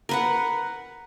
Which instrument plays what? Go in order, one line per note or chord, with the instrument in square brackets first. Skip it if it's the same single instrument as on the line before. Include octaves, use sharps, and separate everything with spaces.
[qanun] A#4 B4 F#5